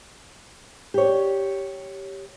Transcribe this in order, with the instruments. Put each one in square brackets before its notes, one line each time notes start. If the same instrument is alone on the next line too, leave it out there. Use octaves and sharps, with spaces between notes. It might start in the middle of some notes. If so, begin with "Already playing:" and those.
[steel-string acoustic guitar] G4 C#5